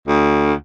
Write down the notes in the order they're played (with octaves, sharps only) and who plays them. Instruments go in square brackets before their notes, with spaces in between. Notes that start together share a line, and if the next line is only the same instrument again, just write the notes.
[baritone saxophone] D2